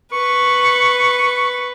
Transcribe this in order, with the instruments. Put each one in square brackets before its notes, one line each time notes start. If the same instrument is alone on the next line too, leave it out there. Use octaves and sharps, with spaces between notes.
[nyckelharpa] B4 [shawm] C#6